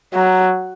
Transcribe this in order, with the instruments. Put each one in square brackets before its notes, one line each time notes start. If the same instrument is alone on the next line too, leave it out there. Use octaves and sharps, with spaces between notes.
[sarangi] F#3